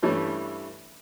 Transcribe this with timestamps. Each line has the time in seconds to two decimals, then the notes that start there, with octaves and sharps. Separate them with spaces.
0.02 G2 E3 G3 A3 C#4 E4